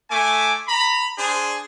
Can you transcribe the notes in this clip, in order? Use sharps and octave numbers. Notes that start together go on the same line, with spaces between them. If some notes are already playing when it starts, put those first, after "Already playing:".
A3 G#5 D6
A#5 B5
D4 G#4 C5